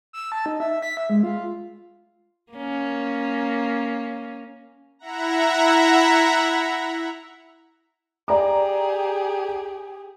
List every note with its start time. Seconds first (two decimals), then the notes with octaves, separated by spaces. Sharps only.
0.13 E6
0.32 A5
0.46 D#4
0.60 E5
0.82 B6
0.97 E5
1.10 G#3
1.23 F4
2.53 A#3 C#4
4.99 E4 E5 F#5 A#5
8.28 G4 G#4 D5 A#5 D6